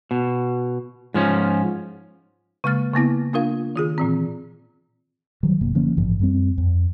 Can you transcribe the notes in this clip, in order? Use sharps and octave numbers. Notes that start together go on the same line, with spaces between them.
B2
G#2 F3 C#4
C#3 G#3 A#3 F6 A6
C#3 A#3 B3 E4
A#3 D4 F4 A#4 F5
D#3 F4 G#4
A#2 E3 C4
D#3 F#3 G3
F#1 B2 A#3
D3 F3 A#3 C#4
A1 G2 F3
F#2 G3 C4
F2